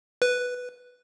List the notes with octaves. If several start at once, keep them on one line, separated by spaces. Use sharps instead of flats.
B4